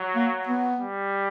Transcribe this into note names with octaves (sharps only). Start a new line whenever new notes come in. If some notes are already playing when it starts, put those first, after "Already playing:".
Already playing: F#3
A#3
B3
G3